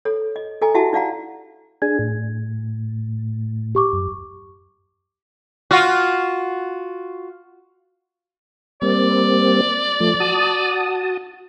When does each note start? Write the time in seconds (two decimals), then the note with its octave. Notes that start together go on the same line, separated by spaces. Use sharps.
0.05 A4 C#5
0.36 D#5
0.62 A4 D#5 G#5 A#5
0.75 E4 F#4 G4 E5 F#5 A5
0.93 D#4 D5 F5 F#5 A#5
1.82 D4 G#4 G#6
1.99 A2
3.75 G4 C#6 D6
3.93 F#2
5.71 F4 F#4
8.82 G3 A#3 C4 D5
10.00 F3 A3
10.20 F#4 A5 D#6